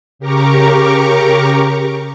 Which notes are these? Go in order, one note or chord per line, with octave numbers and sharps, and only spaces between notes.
C#3 G4 A#4 A#5 C#6 D6